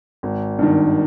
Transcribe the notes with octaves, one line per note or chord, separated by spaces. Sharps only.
G#1
G2 D#3